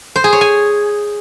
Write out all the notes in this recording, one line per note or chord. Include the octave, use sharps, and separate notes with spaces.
C5
G#4
C#5
G#5